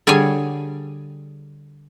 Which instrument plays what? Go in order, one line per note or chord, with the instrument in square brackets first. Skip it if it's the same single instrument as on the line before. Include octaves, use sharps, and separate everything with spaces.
[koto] D3 G3 G#4 C#5 G#5